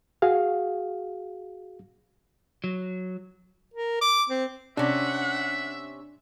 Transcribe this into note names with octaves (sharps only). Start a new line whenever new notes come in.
F#4 G#4 F5
F#3
A#4
D6
C4
C3 C#4 D4 E5 F#5